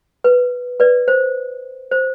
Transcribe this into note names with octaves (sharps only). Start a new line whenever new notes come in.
B4
B4 D5
C5
C5